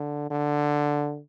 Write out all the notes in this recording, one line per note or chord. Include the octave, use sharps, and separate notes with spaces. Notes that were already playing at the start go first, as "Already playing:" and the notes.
Already playing: D3
D3